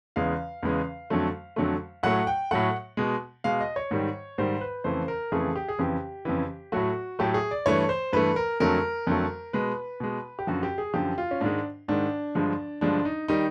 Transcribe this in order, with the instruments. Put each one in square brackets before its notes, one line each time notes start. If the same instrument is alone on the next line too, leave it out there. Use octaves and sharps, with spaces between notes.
[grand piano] E2 C#3 E3 G#3 F5
E2 C#3 E3 G#3
F2 D3 F#3 A3
F2 D3 F#3 A3
A2 F#3 A3 F#5
G5
A2 F#3 A3 F#5
B2 G#3
B2 G#3 F5
D#5
C#5
G#2 D#3 G3
G#2 D#3 G3 C5
B4
F2 C#3 E3 A3 C5
A#4
F2 C#3 E3 A3 G#4
G4
G#4
F2 C#3 E3 G4
F2 C#3 E3
A2 F#3 A3 F#4
A2 F#3 A3 G4
G#4
D5
G2 E3 A3 C#5
C5
G2 E3 A3 B4
A#4
F2 D3 F#3 A3 A#4
F2 D3 F#3 A3
B2 G#3 B4
B2 G#3
G4
F#2 D3 F3 F#4
G4
G#4
F#2 D3 F3 G4
F4
C#4
G#2 D#3 G#3 D4
G#2 D#3 G#3 D4
G2 D3 F3 G#3
G2 D3 F3 G#3 D4
D#4
D#3 G3 D#4